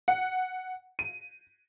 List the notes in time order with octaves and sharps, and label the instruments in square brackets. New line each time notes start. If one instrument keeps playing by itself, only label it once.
[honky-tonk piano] F#5
D#7